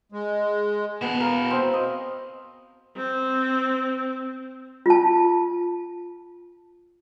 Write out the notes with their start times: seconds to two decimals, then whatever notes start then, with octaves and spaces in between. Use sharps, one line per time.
0.12 G#3
1.01 B2 B3 E4
1.20 A#4 F5
1.51 C4
1.73 D#5
2.96 C4
4.86 F4 A5